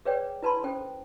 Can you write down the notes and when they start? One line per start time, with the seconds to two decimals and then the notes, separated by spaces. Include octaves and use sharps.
0.05 G#4 B4 C#5 D5 G5
0.42 E4 B4 A5 B5 C6
0.63 C#4 A4 C5 G5